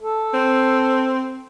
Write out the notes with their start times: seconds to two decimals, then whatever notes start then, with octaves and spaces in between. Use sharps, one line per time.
0.01 A4
0.34 C4